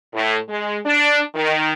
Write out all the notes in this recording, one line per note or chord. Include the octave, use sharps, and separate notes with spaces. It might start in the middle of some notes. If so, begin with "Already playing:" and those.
A2
G#3
D4
D#3